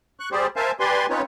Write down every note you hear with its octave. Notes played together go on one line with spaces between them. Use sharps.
C#6 F#6
G3 G4 G#4 C5 D5
A#4 C5 E5 F5 G#5 A5
G4 B4 D5 G#5 C6
C4 C#4 D#4 F4 B4 C#5